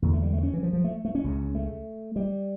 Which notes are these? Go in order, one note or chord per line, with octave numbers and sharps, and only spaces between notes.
E2 D3 A#3
A3
G3
A3
C#4
E3
F3
F3
A3
A3
C#4
C#2 C#3
A3
G3